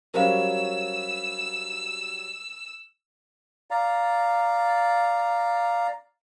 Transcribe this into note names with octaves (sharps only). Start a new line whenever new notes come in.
F#3 G3 C#4 A#4 C5 F5 E6
D5 F5 A#5